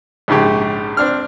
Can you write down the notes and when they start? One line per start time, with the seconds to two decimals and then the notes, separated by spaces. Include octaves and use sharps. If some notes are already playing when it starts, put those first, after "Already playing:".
0.28 A#1 G#2 C#3 G4
0.97 C4 D4 F6